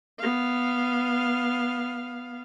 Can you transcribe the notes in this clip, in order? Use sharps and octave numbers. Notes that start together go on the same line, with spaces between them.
B3 F5